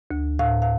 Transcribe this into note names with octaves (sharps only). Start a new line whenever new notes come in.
D2
A2 F5
F5